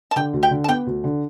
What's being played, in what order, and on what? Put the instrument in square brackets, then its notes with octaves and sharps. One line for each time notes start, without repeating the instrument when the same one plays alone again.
[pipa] A5
[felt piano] D3 [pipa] G4 G5
[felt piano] D2
[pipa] G4 G5
[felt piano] D3
[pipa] A5
[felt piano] B3 [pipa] G4 G5
[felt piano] D2
D3